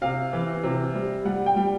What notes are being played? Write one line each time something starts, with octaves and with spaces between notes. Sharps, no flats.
C3 F5
E3
C3
G3
G3 F#5
G5
G3